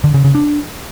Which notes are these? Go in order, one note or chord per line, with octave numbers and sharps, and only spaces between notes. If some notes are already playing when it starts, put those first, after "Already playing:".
D3
C#3
C#3
D4